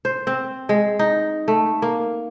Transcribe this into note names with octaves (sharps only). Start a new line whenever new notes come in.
C5
C4
G#3
D#4
A3
A#3